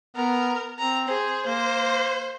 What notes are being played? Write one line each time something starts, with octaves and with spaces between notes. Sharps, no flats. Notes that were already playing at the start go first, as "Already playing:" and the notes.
B3 A#4
C4 A#5
G#4 C5
A#3 C5